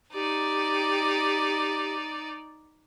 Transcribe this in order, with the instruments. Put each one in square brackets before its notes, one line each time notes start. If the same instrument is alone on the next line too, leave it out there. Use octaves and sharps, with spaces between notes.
[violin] D#4 D5 [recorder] G4